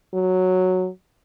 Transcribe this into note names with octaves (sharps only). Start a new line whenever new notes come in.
F#3